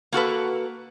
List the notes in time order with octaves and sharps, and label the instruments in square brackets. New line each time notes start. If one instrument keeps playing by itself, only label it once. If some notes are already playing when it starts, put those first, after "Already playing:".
[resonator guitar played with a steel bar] A#3 F#4 A4 B4